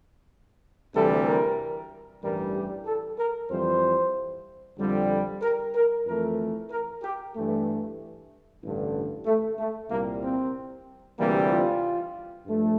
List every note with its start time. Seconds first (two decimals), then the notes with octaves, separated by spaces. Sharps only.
0.93 D2 C3 E3 G3 A4
1.25 A#4
2.22 A1 G2 E3 G3 A#4
2.53 G4
2.86 A4
3.18 A#4
3.49 F2 E3 G3 C5
4.78 F2 D3 G3
5.41 A#4
5.74 A#4
6.05 F2 E3 A3 A#4
6.69 A#4
7.01 G4
7.34 G2 E3 A3
8.61 A1 G2 D3
9.25 A3
9.58 A3
9.89 C2 A#2 G3 A#3
10.22 C4
11.17 D2 C3 E3 G3 A#3
11.49 F4
12.45 G2 F3 A3